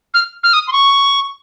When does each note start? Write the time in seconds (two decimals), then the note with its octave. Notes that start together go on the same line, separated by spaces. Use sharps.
0.14 F6
0.43 F6
0.53 D#6
0.68 C6
0.72 C#6